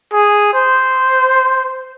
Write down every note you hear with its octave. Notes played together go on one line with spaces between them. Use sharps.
G#4
C5